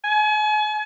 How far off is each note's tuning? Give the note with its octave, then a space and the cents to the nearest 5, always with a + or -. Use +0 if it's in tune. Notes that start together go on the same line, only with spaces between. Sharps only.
G#5 +40